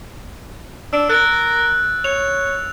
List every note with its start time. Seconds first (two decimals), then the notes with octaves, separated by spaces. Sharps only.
0.93 D4 E6 D7
1.09 A#4 F#6 A6 D7
2.04 C#5 F7